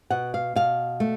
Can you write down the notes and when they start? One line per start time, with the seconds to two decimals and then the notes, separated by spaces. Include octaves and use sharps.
0.10 B2 F#5
0.34 F5
0.55 B2 F5
1.00 A3